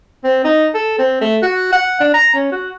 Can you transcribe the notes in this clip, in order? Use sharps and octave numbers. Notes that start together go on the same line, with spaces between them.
C4
D#4
A4
C4
A3
F#4
F#5
D4
A#5
C#4
F#4